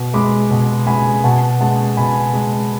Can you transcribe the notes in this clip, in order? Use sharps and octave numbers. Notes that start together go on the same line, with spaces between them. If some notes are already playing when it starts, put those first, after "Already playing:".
Already playing: B2
G#3 B5 D6
B2
G#3 G#5 B5
B2 F#5 A5
G#3 F#5 A5
B2 G#5 B5
G#3